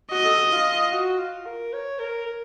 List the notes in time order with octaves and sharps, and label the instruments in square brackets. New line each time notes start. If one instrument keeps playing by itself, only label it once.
[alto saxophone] F#4 [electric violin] D#5
[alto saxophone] A4
F#4
F4
F#4
F4
A#4
C#5
A#4
A#4